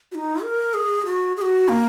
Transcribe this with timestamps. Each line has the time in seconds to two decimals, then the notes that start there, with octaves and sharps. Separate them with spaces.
0.12 F#4
0.15 D#4
0.43 A#4
0.74 G#4
1.06 F#4
1.37 G#4
1.42 F#4
1.69 A#3